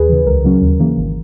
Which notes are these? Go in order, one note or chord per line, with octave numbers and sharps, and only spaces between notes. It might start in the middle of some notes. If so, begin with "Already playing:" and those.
Already playing: D#2 G#4 B4
C#3 E3
C#2 A#4
C#3 F#3 C#4
D#2
C#3 E3 A#3
G#1